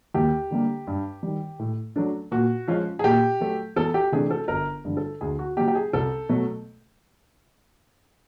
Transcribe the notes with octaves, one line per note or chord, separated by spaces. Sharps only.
D#2 G4
D3 G3 A#3
G2
D#3 G3
A2
F#3 A3 D4
A#2 F#4
F3 G#3 C#4 F4
G#4
A#2 G4
F#3 A3
E2 A4
G4
C3 E3 A3 D4 G#4
A4
G1 A#4
G2 D3 G3
A4
D2 G#4
F#4
C#3 F#3 A#3 G4
G4
G#4
C2 A4
B2 F#3 A3